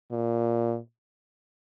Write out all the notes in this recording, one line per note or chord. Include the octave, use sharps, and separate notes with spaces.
A#2